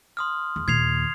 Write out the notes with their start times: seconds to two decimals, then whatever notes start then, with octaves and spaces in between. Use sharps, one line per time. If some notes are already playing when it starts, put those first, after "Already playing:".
0.17 C6 D#6 F6
0.56 E2
0.68 D#2 A#2 G#6 C7 F7